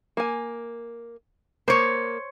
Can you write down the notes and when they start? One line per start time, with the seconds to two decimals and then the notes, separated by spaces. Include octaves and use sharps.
0.17 A#3 G#5
1.68 A#3 C5 C#5